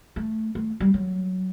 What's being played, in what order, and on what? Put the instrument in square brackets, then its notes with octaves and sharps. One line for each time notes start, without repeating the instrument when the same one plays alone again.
[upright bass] A3
A3
G3
F#3